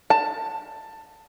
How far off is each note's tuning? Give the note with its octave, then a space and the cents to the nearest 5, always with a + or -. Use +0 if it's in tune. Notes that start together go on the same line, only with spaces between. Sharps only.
A5 +15